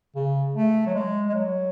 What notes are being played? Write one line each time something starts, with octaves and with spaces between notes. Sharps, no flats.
C#3
A3
F#3
G#3
G#3
F#3